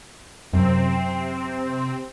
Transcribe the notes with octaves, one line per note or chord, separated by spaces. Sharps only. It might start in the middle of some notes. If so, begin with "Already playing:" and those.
F#2 C3 C4